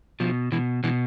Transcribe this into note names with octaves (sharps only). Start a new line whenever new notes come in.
B2 F3
B2 E3
B2 E3